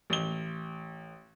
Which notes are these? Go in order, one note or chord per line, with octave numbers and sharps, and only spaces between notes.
A1 G7